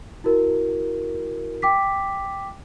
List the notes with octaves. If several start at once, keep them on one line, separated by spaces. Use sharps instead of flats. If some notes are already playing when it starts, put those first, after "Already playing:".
E4 F#4 A#4
G5 D6 B6